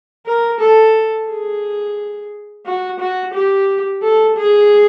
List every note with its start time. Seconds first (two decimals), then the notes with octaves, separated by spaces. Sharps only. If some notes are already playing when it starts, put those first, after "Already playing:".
0.26 A#4
0.60 A4
1.29 G#4
2.66 F#4
3.00 F#4
3.34 G4
4.02 A4
4.37 G#4